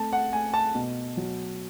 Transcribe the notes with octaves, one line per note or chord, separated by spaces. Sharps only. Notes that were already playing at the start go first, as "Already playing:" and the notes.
Already playing: A3 C4 A5
F#5
A3 G#5
A5
B2
F#3